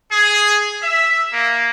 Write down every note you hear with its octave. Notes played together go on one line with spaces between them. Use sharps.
G#4
E5
A#3